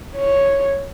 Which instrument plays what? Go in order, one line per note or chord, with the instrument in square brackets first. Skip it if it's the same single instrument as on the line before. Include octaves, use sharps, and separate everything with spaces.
[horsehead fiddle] C#5